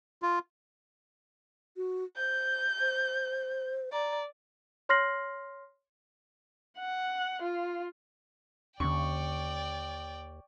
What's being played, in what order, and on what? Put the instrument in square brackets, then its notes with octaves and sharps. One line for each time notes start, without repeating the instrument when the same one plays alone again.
[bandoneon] F4
[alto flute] F#4
[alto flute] C5 [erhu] G6
[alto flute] C5
[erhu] D5 [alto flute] A#5
[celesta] C#5 C6 F6 A#6 C7 F#7
[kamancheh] F#5
F4
[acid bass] D#2 [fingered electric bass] D3 C#4 D4 [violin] D5 G5 [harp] C#6